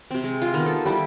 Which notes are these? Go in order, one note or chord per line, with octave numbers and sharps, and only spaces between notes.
C3 C4
G#3
F4
D#3 B3
A4
G3 E4 G4